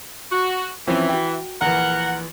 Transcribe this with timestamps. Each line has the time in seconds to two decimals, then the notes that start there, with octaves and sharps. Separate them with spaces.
0.32 F#4
0.87 E3 F3 C4 C#4
1.09 F#4 G5
1.61 A#1 E3 A#4 F#5